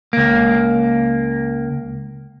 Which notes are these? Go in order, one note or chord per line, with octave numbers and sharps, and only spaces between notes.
C#2 A#3